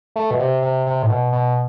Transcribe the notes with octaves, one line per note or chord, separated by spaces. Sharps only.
A3
B2
C3
C3
C3
A2
B2
B2